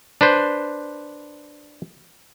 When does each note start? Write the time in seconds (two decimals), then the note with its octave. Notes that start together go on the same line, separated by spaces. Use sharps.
0.21 D4 B4 C5